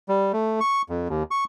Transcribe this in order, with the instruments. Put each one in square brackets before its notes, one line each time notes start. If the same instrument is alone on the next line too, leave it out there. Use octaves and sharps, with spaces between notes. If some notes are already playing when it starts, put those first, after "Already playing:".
[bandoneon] G3
A3
C#6
F2
D#2
C#6